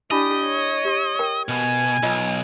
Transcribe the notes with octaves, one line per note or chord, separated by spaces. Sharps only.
D4 E4 G4 D#5 G#5 B5
C#5
G4 C#6
A#4 G5
B2 G#5
B1 F4 D#5